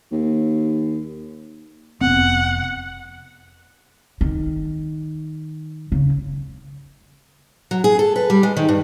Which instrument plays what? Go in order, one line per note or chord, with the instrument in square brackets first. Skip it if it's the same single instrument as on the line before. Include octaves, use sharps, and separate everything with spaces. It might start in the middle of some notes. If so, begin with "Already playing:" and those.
[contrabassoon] D#2
[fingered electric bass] F1 B3 C4 [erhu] F#5
[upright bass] D#3
C#3
[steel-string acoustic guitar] F#3
G#4
A4
B4
G3
G#3
D#3
G2